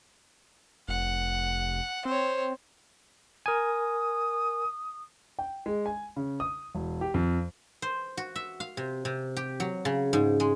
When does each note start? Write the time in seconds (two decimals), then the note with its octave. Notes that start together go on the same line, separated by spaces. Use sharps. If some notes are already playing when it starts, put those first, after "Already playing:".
0.88 F1 F#5
2.05 C4 C5 C#5
3.46 A#4 G#5 D#6
5.39 G5
5.66 G#3
5.86 G#5
6.16 C#3
6.40 D#6
6.75 E1
7.01 G4
7.14 F2
7.82 C5
8.17 F#4
8.36 E5
8.60 F5
8.77 C3
9.05 C3
9.36 G4
9.60 F#3
9.85 C#3
10.13 G#2
10.40 G#3